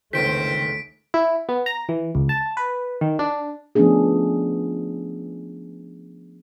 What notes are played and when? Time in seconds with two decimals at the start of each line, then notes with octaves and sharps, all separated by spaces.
0.13 G1 C#2 D#3 A3 C4 C5 B6 D7
1.14 E4
1.49 B3
1.66 A#5
1.89 E3
2.15 C#2
2.29 A5
2.57 B4
3.01 D#3
3.19 D4
3.75 F3 A3 B3 C#4 D4 G#4